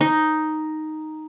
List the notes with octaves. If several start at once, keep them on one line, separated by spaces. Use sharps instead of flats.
D#4